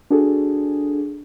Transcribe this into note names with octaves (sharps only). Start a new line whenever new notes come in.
D4 F#4 G#4 A4